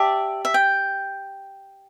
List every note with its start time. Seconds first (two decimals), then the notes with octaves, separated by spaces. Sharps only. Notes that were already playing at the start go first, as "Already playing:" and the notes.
Already playing: G4 D5 E5 A5
0.45 E5
0.54 G5